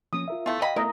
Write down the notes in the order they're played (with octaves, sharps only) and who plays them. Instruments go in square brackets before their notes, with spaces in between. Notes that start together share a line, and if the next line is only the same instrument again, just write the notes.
[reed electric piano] F3 A#3 C#4 [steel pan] D#6
[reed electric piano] F4 A#4 E5
[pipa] A3 F4 [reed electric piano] B3 E4 A6
[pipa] F#3 D#5 B5 [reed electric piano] F5 G5
[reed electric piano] A3 B3 [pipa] E4 [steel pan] A#4 D#5 A#5